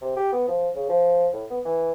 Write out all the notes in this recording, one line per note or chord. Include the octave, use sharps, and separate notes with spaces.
C3
G4
B3
F3
C#3
F3
A2
B3
E3